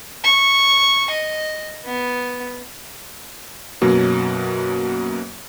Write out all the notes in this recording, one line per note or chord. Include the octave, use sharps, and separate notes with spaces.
C#6
D#5
B3
F#2 B2 F#3 A#3